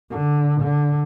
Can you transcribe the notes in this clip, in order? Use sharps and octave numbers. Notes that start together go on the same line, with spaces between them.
D3
D3